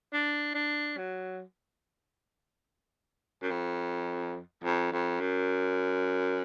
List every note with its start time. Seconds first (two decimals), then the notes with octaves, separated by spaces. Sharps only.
0.13 D4
0.54 D4
0.97 F#3
3.42 F#2
3.51 F2
4.64 F2
4.92 F2
5.20 F#2